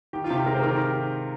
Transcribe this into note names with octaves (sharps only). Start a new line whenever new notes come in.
D#3 G4
F4
C3
G4
G#3 A#4
C5
D#3 A#4
G4